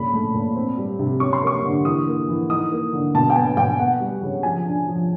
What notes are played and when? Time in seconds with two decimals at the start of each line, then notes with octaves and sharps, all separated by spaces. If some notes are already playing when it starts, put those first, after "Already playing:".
Already playing: A#2 C#3 B5
0.13 A3
0.34 A#2
0.55 C4
0.78 G3
0.99 C3
1.20 C#4 C#6
1.33 C6
1.42 A#3 C#6
1.64 D3
1.85 E3 D#6
2.07 A#3
2.28 E3
2.50 D#4 D#6
2.72 A#3
2.93 D3
3.14 B2 A5
3.30 G5
3.36 B3 G#5
3.57 B2 G5
3.79 B3 F#5
4.00 G3
4.23 C#3
4.43 F3 G#5
4.66 D4
4.88 F3